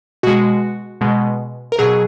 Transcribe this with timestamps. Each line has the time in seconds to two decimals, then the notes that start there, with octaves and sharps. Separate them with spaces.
0.23 B2 G#3 F#4
1.01 B2 G#3
1.72 A#4
1.79 B2 F#3 G#4